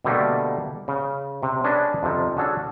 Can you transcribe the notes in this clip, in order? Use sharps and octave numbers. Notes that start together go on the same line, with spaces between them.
B2 D3 G3 A3 A#3
C#3
C3
C#4 D4 G#4 B4 D5 D#5
F2 C3 F3
C#4 D4 F#4 G#4 A4